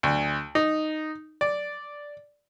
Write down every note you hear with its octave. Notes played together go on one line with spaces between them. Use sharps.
D2
D#4
D5